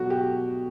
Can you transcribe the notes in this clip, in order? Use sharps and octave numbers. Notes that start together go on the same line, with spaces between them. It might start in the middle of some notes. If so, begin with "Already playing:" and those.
Already playing: B2 F#3 F#4
G4